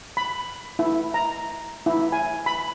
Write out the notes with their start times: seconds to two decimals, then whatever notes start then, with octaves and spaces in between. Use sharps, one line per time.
0.17 B5
0.79 E4
1.14 A#5
1.86 E4
2.12 G#5
2.46 B5